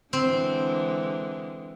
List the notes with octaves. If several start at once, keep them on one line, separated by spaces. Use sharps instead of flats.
D3 E3 G#3 C4